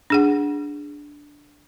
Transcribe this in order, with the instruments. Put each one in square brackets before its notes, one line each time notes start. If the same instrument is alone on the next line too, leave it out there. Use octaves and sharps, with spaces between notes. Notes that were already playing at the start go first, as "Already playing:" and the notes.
[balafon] D4 G#4 F#5